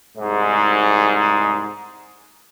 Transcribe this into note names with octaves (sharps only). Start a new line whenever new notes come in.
C2 G#2